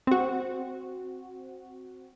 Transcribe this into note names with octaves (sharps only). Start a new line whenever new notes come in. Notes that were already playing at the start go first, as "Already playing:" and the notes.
C4 F#4